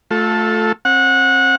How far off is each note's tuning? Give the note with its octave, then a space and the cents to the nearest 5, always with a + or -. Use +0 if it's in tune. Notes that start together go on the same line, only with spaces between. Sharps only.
A3 -5 F4 +30 A4 +0
C4 +35 F#5 -20